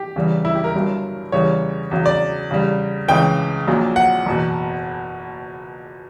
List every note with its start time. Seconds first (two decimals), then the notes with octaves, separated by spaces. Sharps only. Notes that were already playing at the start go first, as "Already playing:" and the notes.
Already playing: G4
0.16 E2 C#3 E3 G3
0.45 E4
0.55 G4
0.64 A#4
0.75 G1 G2 F#3
1.32 E2 C#3 E3 G3 C#5
1.91 E2 C#3 F#3
2.06 D5
2.51 E2 C#3 G3
3.08 C#2 C#3 E3 G5
3.67 A#1 A#2 F#3
3.96 F#5
4.26 F#1 E2 B2